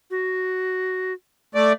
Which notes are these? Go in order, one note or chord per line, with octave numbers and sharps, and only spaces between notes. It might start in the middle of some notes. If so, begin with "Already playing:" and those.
F#4
A3 D5